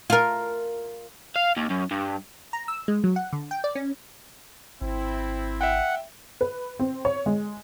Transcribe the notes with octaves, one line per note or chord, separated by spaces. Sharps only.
F4 A#4
F5
D#2
F#2
G2
A#5
E6
G#3
F#3
F#5
D3
G5
D5
C#4
G#1 C4 E4
E5 F#5 G5
B4
C4
C#5
G#3